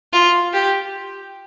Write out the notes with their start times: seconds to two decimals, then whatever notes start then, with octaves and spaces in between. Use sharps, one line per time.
0.13 F4
0.53 G4